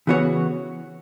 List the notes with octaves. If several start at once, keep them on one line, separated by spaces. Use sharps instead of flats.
C#3 E3 B3 F#4 C#5